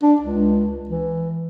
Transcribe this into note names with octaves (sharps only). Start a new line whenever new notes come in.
D4
C#2
E3